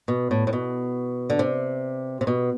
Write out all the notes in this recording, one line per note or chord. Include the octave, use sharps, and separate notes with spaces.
B2
A2
A2
B2
D3
C3
C3
B2